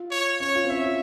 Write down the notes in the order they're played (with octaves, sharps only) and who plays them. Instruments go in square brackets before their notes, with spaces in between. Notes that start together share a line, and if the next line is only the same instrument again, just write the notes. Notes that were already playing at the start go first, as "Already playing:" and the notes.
Already playing: [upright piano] F4
[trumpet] C#5
[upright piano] C#4 [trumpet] C#5
[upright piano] F4
C4
[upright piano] C#4 [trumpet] E5
[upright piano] F4